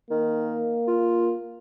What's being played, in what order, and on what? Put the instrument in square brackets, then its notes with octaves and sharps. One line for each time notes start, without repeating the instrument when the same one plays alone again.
[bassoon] D#3 [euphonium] A#3
[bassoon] F4